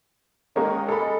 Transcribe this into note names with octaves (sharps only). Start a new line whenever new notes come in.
D#3 G#3 A#3 C#4
G#3 A4 B5